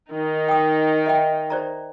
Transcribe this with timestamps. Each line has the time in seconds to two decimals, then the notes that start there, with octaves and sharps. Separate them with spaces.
0.12 D#3 D#4
0.49 G5 D#6
1.06 D#5 E5 G5
1.50 C5 D5 A#5